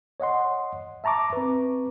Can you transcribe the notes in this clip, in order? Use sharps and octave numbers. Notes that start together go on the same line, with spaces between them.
C#5 D#5 F#5 C6
E5 A5 A#5 C#6 D6
C4 B4